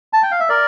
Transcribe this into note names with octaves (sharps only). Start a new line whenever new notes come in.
A5
G5
F5
E5
A#4 D5